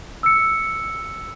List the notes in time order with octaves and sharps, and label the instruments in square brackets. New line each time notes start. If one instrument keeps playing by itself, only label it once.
[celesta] E6 C#7